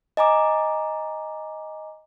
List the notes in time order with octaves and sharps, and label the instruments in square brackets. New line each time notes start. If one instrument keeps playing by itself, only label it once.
[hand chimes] D#5 G#5 A#5 D6